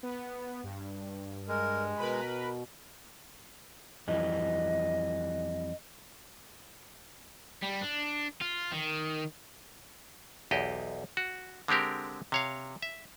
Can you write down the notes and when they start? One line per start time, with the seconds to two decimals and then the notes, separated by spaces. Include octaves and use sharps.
0.03 B3
0.64 G2
1.48 G#3 A#4
1.97 B2 A#4 B4 B5
4.08 F2 E3 G3 D#5
7.62 G3
7.81 D4
8.41 F4
8.72 D#3
10.51 B1 E2 G4 D#5
11.17 F#4
11.68 D3 G#3 C4 G4 A#4
12.32 C3 C#5 F5
12.82 E5